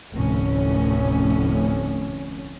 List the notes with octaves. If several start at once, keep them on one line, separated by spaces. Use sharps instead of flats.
F1 D2 A2 C#4